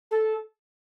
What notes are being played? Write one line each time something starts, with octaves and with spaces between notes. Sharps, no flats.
A4